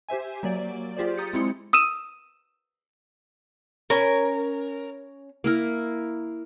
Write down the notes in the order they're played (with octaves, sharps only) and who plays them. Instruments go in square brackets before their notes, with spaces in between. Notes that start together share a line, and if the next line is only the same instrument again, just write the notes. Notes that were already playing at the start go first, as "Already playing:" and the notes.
[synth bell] G4 C5 E5 G#5
F#3 A#3 D5
F4 G4 G#4 C5 D5
A#5 D#6 G6 A6 C#7
G#3 C4 E4 C6 C#7
[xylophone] D#6 E6 D#7 E7
[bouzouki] C#4 G#5 [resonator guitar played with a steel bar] A#4
[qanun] A#3 E4 A#4